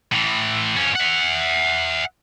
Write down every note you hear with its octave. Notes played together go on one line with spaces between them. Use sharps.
A2 E3
F2 C#4
E5 F#5